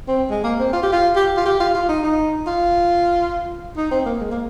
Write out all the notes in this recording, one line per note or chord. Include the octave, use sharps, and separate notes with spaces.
C4
G#3
A#3
C4
F4
G4
F4
G4
F4
G4
F4
F4
D#4
D#4
F4
D#4
C4
A#3
G#3
A#3